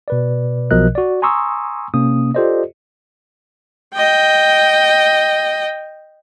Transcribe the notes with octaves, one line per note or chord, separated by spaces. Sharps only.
B2 B4 D5
B1 B2 F3 A#4 D#5 F#6
F#4 D5
G#5 A#5 C6 C#6 D#6 E6
C3 A#3 C#4 D#6
F4 G4 A4 C5 D5 D#5
D#5 G5